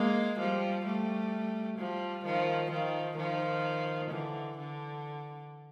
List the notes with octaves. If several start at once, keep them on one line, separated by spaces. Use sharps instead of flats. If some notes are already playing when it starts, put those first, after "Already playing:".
Already playing: G#3 A#3
F3 G3
G3 A3
F3 G3
D#3 F3
D#3 F3
D#3 F3
D3 E3
D3